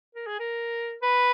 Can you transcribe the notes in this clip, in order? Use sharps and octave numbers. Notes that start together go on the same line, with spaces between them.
A#4
G#4
A#4
B4